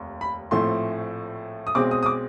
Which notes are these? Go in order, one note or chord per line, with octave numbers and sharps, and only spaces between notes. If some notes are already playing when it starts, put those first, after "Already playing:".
Already playing: F1 D#2
B5
A#1 A2 F3 A3 C4 C6
D#6
B1 B2 G#3 C4 D6
D#6
D#6
D6